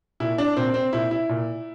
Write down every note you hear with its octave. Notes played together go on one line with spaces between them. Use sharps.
A#2 E4
D4
A#2 C4
C4
A#2 E4
E4
A#2